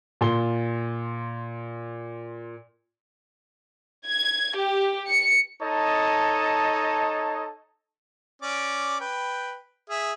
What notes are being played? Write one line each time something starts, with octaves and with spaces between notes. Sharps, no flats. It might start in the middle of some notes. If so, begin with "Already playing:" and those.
A#2 C6 G7
G#6
G4
C#7
D#4 A4 C#5 D#5 A5
C#4 D5 D6
B4 G5
G#4 E5